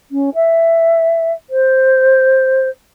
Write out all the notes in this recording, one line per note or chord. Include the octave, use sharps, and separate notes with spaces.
C#4
E5
C5